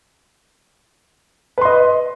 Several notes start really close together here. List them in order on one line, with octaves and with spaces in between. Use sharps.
B4 C6 D#5